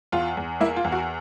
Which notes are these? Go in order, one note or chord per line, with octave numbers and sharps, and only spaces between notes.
E2 F4
E2
A#3 E4
F4
E2
F#4